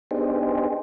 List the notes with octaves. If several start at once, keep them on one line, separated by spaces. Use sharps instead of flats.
B3 D4 D#4 G4 G#4 C5